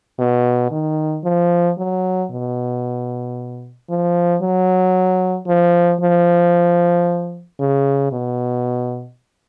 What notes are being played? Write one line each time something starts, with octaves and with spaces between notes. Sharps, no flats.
B2
D#3
F3
F#3
B2
F3
F#3
F3
F3
C#3
B2